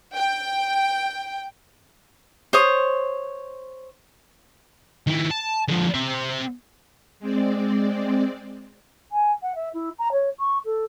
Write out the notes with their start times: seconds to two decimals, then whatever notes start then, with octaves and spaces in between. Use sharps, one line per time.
0.13 G5
2.53 C5 C#5 D#6
5.07 D#3 E4
5.31 A5
5.68 D3 F3
5.94 C4 E5
7.20 G#3 C4 D5
9.12 G#5
9.42 F#5
9.55 E5
9.74 E4
9.98 A#5
10.12 C#5
10.39 C#6
10.65 A4